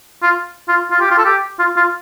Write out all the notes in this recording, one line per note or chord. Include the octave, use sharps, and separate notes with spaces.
F4
F4
F4
G4
F4
A4
G4
F4
F4